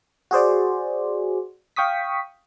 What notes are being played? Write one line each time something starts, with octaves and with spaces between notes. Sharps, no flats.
F#4 G#4 C5 D5
F5 G5 C#6 D#6 B6